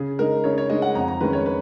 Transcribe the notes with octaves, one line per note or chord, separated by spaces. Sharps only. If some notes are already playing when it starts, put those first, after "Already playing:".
Already playing: C#3 G#4
G#3 D#4 A#4
C#3 C#5
C#5
G#3 D#4 D#5
F#5
F2 A#5
A#5
D#3 G#3 C#4 B4
C#5
B4